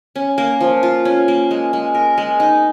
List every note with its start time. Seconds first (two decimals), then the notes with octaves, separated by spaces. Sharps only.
0.16 C#4
0.38 A#3
0.61 F3
0.83 F4
1.05 C#4
1.28 A#3
1.51 G#3
1.73 G#3
1.94 A#4
2.18 G#3
2.40 D#4